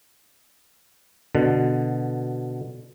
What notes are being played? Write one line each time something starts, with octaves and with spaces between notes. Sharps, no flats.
B2 D3